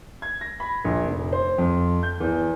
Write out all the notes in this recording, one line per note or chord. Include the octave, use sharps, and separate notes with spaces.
G#6
A#6
B5
A#1
F1
C5
F2
G6
E2